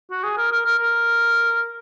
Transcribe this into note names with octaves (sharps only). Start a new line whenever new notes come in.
F#4
G#4
A#4
A#4
A#4
A#4